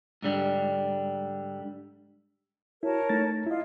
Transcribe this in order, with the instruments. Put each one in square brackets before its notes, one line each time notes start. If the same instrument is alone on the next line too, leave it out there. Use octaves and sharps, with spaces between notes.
[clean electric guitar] G#2 D3 G3
[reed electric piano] E4 F#4 [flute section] A#4 C#5 A5
[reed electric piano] A3 D#4 A6
[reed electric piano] E4 D#5 [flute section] F4